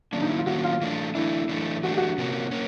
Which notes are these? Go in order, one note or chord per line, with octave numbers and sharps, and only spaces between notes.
D#3 F#3 A#3 C#4 D4
D#4
E4
F4
D#3 F#3 A#3 C#4 F#4
F4
E3 A3 D4
E3 A3 D4 E4
E3 A3 D4
E3 A3 D4 F#4
G4
F#4
C3 F3 A#3 C#4
A#3 C#4